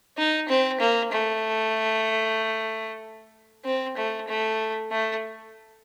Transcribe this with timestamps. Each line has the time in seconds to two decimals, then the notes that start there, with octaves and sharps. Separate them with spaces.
0.18 D#4
0.49 C4
0.80 A#3
1.12 A3
3.65 C4
3.97 A3
4.28 A3
4.92 A3